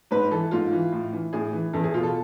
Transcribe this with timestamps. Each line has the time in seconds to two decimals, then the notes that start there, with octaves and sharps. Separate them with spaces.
0.11 G#2 B4
0.31 E3 A4
0.51 G#2 F4
0.72 E3
0.92 A2
1.12 E3
1.33 A2 G#4
1.53 E3
1.73 E2 A4
1.84 G#4
1.94 B2 F4
2.03 A4